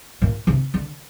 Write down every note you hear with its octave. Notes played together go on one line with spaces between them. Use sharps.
A#2
C3
D3